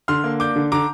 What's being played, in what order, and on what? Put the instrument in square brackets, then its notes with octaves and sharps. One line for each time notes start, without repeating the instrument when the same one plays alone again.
[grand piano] D3 C6 F6
A#3
D4 D6 G6
D3
D3 A#5 D6